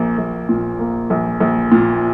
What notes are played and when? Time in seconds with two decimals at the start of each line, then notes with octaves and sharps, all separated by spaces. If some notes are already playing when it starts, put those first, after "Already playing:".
Already playing: A#1 A#3
0.18 A#1
0.49 A#2
0.79 A#3
1.10 A#1
1.40 A#1
1.72 A#2